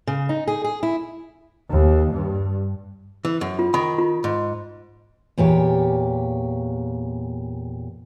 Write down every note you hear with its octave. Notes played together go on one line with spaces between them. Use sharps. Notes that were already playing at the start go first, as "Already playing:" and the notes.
C#3
D#4
G#4
G#4
E4
D#2
G2
E3
F#2
F4
D#3 B5
F4
G#2
E2 A#2 G4 C#5